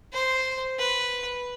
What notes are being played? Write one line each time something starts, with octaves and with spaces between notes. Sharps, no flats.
C5
B4